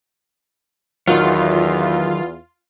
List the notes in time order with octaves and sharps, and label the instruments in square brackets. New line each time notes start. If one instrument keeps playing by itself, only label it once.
[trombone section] E2 [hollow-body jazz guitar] D#3 F#3 [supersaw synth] F4